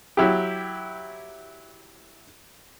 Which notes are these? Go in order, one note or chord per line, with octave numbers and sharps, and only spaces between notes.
F#3 E4 G4